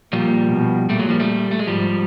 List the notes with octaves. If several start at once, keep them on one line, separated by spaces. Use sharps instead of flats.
A#2 F3 G3
B2
A#2 G3 A3
F#3 G#3
F3 G3
G3 A3
A3
G#3
G#2 F3 G3